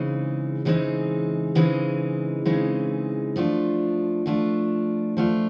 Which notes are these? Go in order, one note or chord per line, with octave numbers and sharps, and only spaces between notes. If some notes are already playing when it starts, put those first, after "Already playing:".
Already playing: C#3 E3 G#3 C4 D#4
C#3 E3 G#3 C4 D#4
C#3 E3 G#3 C4 D#4
C#3 E3 G#3 C4 D#4
F3 A3 D4 F4
F3 A3 D4 F4
F3 A3 D4 F4